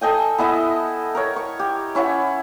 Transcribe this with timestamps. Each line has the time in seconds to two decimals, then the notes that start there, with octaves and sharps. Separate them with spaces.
0.01 A4 D#5 G5 G#5
0.38 B3 E4 D#5 E5
1.15 A#4 C#5
1.36 C#6
1.59 G4
1.95 C#4 E4 C#5 F#5